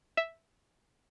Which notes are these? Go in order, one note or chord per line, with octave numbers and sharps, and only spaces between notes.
E5